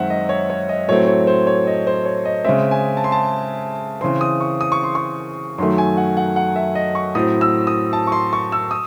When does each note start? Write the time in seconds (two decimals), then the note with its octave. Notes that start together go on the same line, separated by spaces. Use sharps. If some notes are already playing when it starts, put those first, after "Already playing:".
Already playing: F#2 D#3 G#3 C4 E5 F#5
0.10 D#5
0.29 C#5
0.50 C#5
0.69 D#5
0.88 A2 F#3 A3 C4 C#5
1.07 C#5
1.27 C5
1.47 C#5
1.67 D#5
1.87 C5
2.05 C#5
2.25 D#5
2.44 C#3 G#3 C4 E5
2.71 G#5
2.97 A5
3.04 C6
3.12 A5
4.01 C#3 E3 C4 C6
4.21 D#6
4.41 C#6
4.61 D#6
4.72 C#6
4.83 C6
4.95 C#6
5.58 F#2 D#3 F#3 A3 C6
5.78 G#5
5.97 F#5
6.17 F#5
6.36 F#5
6.56 E5
6.75 D#5
6.95 C#6
7.15 A2 F#3 C4 D#6
7.41 E6
7.67 D#6
7.93 A5
8.07 C#6
8.12 C6
8.33 C#6
8.52 E6
8.71 D#6